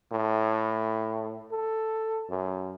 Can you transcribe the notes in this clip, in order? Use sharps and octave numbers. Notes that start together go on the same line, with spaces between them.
A2
A4
F#2